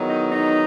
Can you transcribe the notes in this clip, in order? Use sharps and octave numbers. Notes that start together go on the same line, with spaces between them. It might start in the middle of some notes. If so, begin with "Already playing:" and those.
Already playing: E2 D#3 F#3 B3
D#4
D#4